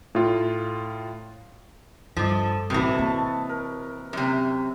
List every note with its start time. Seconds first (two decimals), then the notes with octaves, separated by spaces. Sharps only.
0.15 A2 F4
2.17 G2 F3 A4 D5 D#5
2.70 A1 A2 C3 E3 F#4 B4 D#6
2.99 A#3 C#5 A5
3.49 A#4
4.13 F#2 C3